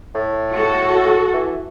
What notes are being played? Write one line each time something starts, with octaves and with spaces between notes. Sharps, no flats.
A2
F#4 A4
E3